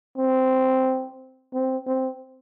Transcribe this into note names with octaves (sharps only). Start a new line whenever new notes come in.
C4
C4
C4